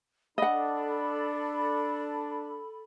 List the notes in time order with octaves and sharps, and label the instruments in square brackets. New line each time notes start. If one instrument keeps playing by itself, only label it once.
[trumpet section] D4 [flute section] A4 B5 [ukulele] D#5 F#5